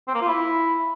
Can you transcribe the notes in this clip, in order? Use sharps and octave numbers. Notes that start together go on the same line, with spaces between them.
C4
A#3
F4
E4